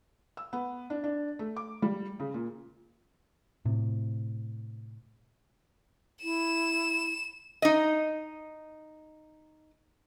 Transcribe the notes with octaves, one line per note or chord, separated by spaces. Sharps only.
E6
B3
D4
D4
A3
D6
G3
C#3
A#2
A2 C3
E4 E7
D#4 D#5